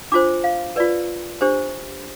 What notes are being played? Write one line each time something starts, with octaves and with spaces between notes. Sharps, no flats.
D4 F4 C5 D6
F5
F4 B4 D5
D4 G4 C5